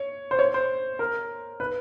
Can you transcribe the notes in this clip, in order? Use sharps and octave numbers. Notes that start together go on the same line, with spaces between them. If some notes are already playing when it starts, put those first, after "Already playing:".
Already playing: C#5
C5
C#5
C5
A#4
B4